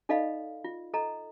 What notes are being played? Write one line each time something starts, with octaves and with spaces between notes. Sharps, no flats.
D#4 A4 D5 D#5 F5 B5
F4
A4 D#5 A#5